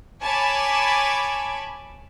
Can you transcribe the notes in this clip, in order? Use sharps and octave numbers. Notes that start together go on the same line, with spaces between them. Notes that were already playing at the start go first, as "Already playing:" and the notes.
C#5 G#5 A5 B5 D6